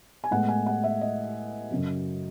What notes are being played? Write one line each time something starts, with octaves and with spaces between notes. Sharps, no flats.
G#5
A2 G#3 B3 F#5
G#5
F#5
E5
D#5
F#2 C#3 F#3